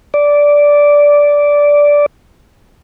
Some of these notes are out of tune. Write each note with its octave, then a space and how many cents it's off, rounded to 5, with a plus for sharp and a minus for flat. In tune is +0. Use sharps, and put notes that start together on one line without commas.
D5 -10